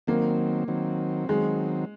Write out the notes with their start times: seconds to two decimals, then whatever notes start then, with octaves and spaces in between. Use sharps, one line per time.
0.07 D#3 F#3 A#3 C4
0.68 D#3 F#3 C4
1.29 D#3 F#3 G#3 C4